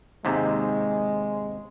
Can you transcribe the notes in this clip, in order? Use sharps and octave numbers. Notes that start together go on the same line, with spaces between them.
D#2 G#2 C3 G#3